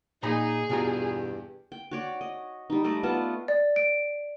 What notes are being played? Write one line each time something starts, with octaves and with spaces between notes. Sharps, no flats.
A#2 D#4 G#4 A#5 B5
E2 G2 B2 F4 G4 A#5
G5
F#4 C#5 D5
D#5
G3 D#4
G3 A3 D5 D#5
B3 F4 F#5 A5
D5
D7